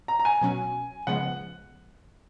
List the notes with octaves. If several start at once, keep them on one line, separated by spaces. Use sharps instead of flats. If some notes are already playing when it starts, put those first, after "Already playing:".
A#5
A#5
G#5
B2 F#3 C#4 F#4
C#3 F3 G#3 B3 F#5